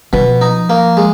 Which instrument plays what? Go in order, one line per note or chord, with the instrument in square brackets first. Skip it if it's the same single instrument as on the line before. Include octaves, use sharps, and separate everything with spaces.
[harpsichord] B2 [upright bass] F3
[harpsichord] D#4
A#3
G#3